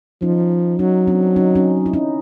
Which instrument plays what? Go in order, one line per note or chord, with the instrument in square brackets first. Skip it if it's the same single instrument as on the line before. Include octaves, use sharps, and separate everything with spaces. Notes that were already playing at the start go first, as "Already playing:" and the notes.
[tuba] F3 [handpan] C#4 D#4
[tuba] F#3 [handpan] C#4 D#4
[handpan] C4 D4
C#4 D#4
C#4 D#4
E4
C#4 D#4